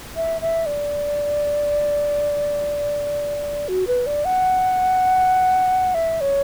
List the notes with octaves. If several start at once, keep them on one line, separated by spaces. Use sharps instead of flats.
E5
E5
D5
F#4
B4
D5
F#5
E5
C#5